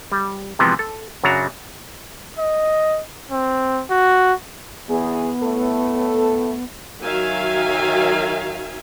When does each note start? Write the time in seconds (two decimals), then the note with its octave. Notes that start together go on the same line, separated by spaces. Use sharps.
0.12 G3
0.59 C3 E3 F3 G#3 B3 C4
0.79 A4
1.24 F#2 C#3 F#3 D4 F#4 A#5
2.39 D#5
3.31 C4
3.90 F#4
4.88 E2 B3 G#4
5.42 A2 A3 A4
7.02 D#3 F#3 E5 F5 G#5